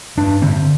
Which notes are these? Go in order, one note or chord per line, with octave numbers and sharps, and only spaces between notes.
G2 D4
D3 C4